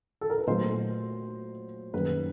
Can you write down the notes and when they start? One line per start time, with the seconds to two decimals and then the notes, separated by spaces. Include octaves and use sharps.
0.21 A4
0.30 A#4
0.38 B4
0.47 A#2 F#3 A3 C5
1.93 F#2 D#3 G3 A#3 B4